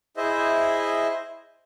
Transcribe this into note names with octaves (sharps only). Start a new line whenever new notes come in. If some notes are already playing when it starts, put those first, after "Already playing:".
E4 G#4 C5 D#5 E5